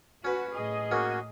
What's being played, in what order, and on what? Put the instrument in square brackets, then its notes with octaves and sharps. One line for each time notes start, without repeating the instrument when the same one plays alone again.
[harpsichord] C#4 B4 [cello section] F#4
[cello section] A2 G#4 D#5
[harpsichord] A#3 C#4 [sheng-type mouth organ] F#4